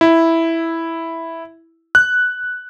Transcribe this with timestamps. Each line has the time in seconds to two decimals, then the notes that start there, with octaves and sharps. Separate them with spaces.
0.01 E4
1.95 F#6